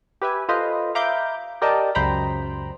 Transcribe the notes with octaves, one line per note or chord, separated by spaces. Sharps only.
G4 B4 E5 G#5
F4 A4 B4 C5 D#5
E5 F5 A#5 B5 D6 G6
G4 A#4 D5 D#5 G5 A5
C#2 F#2 C5 G5 A#5 B5